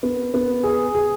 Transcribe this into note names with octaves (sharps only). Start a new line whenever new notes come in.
B3
B3
G#4
G#4